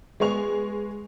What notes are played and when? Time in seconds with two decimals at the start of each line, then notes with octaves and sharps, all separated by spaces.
0.20 G#3 B3 G#4 C#6 F7